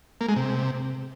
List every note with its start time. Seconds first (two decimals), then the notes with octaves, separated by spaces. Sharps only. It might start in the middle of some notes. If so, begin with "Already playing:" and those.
0.21 A#3
0.29 G#3
0.36 C3